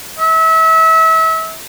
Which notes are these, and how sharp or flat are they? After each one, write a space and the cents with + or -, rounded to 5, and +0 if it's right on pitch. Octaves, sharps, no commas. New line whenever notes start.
E5 -30